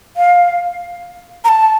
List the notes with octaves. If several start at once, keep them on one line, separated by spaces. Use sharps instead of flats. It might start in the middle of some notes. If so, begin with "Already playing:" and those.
F5
A#5
A5